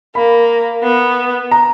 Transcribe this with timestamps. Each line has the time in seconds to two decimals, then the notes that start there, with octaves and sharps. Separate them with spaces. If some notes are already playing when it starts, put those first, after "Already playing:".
0.15 A#3 B5
0.83 B3
1.51 A#5